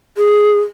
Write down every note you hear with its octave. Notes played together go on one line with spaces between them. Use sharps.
G#4